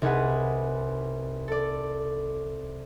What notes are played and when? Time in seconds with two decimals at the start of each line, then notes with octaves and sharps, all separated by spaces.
0.02 C2 D#4 G#4 B4 F#5
1.48 A4 D5